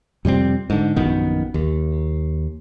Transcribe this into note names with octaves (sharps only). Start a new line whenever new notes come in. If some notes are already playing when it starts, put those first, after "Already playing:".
F2 C3 G3 C4
G#2 D3
A#1 F#2 D#3 B3
D#2